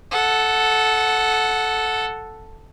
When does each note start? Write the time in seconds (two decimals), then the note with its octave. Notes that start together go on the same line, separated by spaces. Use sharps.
0.11 A4 F#5